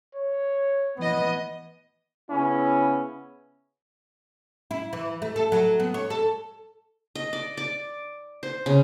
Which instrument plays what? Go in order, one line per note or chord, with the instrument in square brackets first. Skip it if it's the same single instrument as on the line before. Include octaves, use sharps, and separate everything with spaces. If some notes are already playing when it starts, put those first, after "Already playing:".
[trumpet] C#5
[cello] E3 D#5 [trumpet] B3
[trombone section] C#3 B3 C#4 E4
[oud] E4
E3
A3
A4
F#3
B3
C#5
A4
[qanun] D#5
D5
D5
C5
C#3